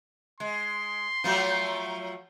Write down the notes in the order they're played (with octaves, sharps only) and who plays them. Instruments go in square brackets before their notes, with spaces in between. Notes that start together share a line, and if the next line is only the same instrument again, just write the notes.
[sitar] G#3 [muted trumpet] C6
[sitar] F3 F#3 A3